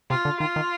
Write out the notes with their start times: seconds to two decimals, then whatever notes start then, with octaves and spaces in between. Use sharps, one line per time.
0.10 C3 F4
0.25 D3
0.40 D#3 F4
0.56 D#3